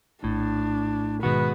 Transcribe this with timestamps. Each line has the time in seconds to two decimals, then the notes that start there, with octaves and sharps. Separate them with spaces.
0.24 A#1 A2 D4
1.23 G#2 B2 D#3 G#3 B3 F#4 B4